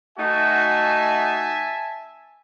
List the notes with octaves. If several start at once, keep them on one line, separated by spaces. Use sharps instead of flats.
A3 D#4 F#4 E5 G#5 A5